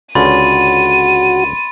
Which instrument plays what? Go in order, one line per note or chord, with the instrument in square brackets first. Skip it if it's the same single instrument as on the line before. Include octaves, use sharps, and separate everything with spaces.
[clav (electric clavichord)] C#2 D3 C#4 [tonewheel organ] F#4 [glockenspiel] B5 C6 A6 [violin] D#7